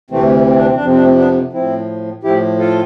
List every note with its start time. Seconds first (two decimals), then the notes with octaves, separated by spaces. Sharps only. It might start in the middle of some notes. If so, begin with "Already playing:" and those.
0.10 D2 C3 E3 A3 C4
0.47 C4
0.56 D4
0.65 C4
0.75 D4
0.81 F2 C3 F3 C4
0.94 D4
1.03 A3 C4
1.17 B3 D4
1.53 A2 F3 C4 E4
2.23 A2 F3 E4 G4
2.59 F4 A4